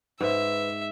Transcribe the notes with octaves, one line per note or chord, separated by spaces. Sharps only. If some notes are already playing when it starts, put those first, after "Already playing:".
G#2 B4 C5 E5